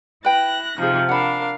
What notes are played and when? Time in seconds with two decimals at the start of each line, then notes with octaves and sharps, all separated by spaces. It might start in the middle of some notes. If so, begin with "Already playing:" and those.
0.25 E4 B4 G5 F#6 A#6
0.78 C3 F3 D#4 G#4
1.09 D4 A#4 F5 F#5 B5